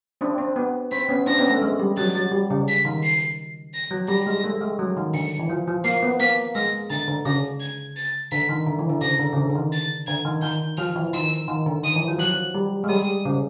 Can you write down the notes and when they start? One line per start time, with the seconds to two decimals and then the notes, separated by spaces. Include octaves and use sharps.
0.21 C4 D4
0.38 C4
0.56 B3
0.92 C4 B6
1.09 B3 C#4
1.26 C4 D4 A#6
1.38 B3 C#4
1.50 A3
1.62 G#3
1.80 G3
1.97 F#3 A6
2.15 F#3
2.32 G3
2.50 C#3
2.68 B6
2.85 D#3
3.03 C7
3.74 A#6
3.91 F#3
4.08 G3 A#6
4.26 G#3
4.44 A3
4.61 G#3
4.79 F#3
4.97 D#3
5.14 D3 C#7
5.39 E3
5.49 F3
5.68 F3
5.84 A#3 C7
6.03 B3
6.20 A#3 B6
6.55 G#3 A#6
6.90 D3 A6
7.08 D3
7.25 C#3 A#6
7.60 G#6
7.96 A6
8.31 D3 B6
8.49 D#3
8.67 D3
8.79 E3
8.89 D3
9.01 C#3 A#6
9.20 D3
9.33 C#3
9.37 D3
9.50 D3
9.55 D#3
9.73 A6
10.07 D3 G#6
10.25 D#3
10.42 D#3 G6
10.77 F3 F6
10.96 E3
11.13 D#3 E6
11.48 D#3
11.66 D3
11.83 D#3 D#6
11.96 E3
12.08 F3
12.18 F#3 F#6
12.54 G3
12.84 G#3
12.89 G3 D#6
13.25 C#3